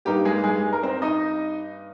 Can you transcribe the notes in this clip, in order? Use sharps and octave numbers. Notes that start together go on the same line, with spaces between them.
G2 G3 A#3 D#4 G4
G#3 G#4
G#3 G#4
A#4
C4 C5
D#4 D#5